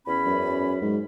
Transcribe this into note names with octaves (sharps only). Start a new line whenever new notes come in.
E2 C#4 B5
F#2
G#2